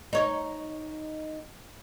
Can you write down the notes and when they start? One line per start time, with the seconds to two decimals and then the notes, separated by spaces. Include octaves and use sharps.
0.13 D#4 C#5